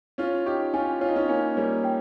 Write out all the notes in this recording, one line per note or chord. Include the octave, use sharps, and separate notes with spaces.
C#4 F4 C#5
D#4 G4 C#6
C#4 F4 G#5
F4 C#5
D#4
C#4 F4
A#3 C#4 G#5
G3 A#3 C#5
G5